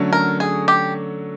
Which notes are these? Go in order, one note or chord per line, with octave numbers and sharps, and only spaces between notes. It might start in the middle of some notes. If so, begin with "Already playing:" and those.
Already playing: D3 F#3 A3 C#4
A#4
G#4
G4